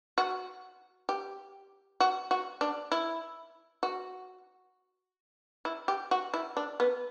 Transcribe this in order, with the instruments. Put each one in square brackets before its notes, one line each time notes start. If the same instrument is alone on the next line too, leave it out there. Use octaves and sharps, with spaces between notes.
[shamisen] F#4
G4
F#4
F#4
D4
E4
F#4
E4
G4
F#4
E4
D4
B3